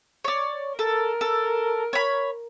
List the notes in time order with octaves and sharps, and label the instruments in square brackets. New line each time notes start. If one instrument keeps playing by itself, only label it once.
[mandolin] C#5 D5
[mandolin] A4 [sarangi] A#4
[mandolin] A4
C#5 B5